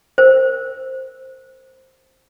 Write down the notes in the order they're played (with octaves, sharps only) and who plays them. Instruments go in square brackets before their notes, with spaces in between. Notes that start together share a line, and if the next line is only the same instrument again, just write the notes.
[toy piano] A#4 C5